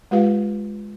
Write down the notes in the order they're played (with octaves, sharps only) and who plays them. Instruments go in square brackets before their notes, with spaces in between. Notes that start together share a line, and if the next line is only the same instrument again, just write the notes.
[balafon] G#3 F4 G4 B4 F5